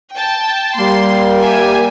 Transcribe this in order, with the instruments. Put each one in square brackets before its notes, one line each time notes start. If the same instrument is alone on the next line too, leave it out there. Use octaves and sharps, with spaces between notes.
[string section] G5 A5
[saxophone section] G3 A#3 [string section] C6
[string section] G4 E5 G#5